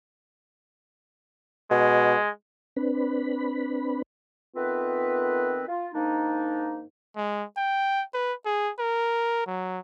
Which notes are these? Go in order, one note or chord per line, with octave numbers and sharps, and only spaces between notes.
B2 G#3
C4 D4 B4 B5
D#3 A3 B3 C4 F4 B4
F4
G#2 D#3 A#3 D4 D#4
G#3
G5
B4
G#4
A#4
F#3